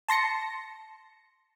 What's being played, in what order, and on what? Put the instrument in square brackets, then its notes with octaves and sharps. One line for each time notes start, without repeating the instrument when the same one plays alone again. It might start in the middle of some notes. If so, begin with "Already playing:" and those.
[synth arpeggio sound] A5 C6 A#6 C#7